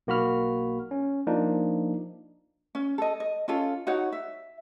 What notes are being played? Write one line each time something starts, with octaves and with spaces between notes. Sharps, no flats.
B1 A#3 F#4 B5 F6
C#4
F3 A#3 D4 D#4
C#4
A4 D#5
D#5
C#4 F4 A4
D#4 F#4 C#5 F#5
E5